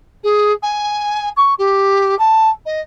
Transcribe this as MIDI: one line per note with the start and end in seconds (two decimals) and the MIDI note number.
0.23 0.52 68
0.62 1.29 80
1.37 1.54 85
1.58 2.17 67
2.19 2.49 81
2.65 2.81 75